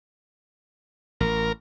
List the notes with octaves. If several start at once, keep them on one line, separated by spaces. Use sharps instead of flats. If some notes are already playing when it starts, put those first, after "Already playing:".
A1 A#4